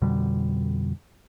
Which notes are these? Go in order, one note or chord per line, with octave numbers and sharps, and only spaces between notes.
F2 B2 D3 G3